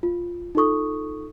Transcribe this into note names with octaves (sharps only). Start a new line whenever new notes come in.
F4
D#4 F4 A4 C#6 D#6